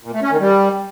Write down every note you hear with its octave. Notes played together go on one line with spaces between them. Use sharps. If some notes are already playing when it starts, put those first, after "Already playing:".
A#2
A3
C#4
D#3
G3